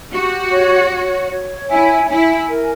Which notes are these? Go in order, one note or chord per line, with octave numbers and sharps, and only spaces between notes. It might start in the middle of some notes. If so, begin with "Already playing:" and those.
F#4 G4
C#5
C#5
C#5
E4 G#5
E4 G#5
A#4